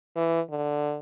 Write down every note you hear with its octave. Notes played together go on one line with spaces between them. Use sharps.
E3
D3